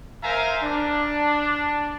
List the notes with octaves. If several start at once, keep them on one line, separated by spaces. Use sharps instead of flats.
A#4 C5 E5 F5 G#5 A#5
D4